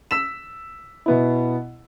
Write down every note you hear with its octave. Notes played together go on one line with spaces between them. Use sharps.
E6 B6 E7
B2 B3 E4